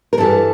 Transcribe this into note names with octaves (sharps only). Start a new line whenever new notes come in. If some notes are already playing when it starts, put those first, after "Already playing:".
A#4
G2 E3 G3 A4